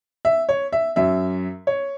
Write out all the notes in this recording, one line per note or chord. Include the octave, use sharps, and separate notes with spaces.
E5
C#5
E5
F#2 F#3 E5
C#5